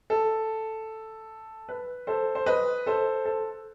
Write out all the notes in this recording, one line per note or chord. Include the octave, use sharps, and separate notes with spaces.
A4
B4
A4 C5
C5
B4 D#5
A4 C5
A4